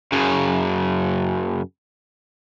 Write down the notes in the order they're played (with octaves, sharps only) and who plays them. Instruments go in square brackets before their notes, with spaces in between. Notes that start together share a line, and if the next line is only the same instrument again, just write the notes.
[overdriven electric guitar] F#2 C#3